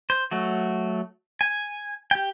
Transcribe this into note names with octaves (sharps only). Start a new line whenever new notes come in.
C5
F#3 A3 F#4
G#5
G4 G5